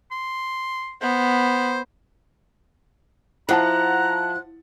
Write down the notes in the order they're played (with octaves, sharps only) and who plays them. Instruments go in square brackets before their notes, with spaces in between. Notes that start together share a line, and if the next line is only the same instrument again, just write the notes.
[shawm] C6
[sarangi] B3 [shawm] C5
[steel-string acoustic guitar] F3 [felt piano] E4 F#5 A5 [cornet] A#5 [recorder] F#6